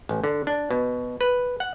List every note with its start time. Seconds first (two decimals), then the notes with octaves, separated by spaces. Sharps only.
0.09 A1
0.24 D3
0.47 D4
0.71 B2
1.21 B4
1.60 F#5